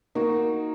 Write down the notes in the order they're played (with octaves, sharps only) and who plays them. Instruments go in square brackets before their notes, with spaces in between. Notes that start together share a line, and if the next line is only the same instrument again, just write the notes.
[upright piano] A#3 [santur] D#4 F#4